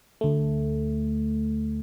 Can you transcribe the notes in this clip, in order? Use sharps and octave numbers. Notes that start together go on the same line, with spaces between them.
D2 A3